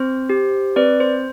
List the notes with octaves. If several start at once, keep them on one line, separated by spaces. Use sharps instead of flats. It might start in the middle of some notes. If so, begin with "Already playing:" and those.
Already playing: C4 C5
G4
C4 B4 D5
C5